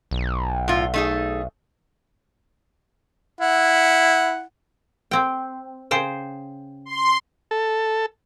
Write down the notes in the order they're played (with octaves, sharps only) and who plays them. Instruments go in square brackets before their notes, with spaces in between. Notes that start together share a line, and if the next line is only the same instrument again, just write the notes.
[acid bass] B1
[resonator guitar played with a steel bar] A2 F4
A3 D#4 G#4
[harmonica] E4 F#5
[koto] C4 G5
C#3 C5 G5
[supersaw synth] C6
[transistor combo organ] A4